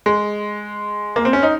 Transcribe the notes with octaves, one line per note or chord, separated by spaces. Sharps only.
G#3
A#3
C4
C#4
D#4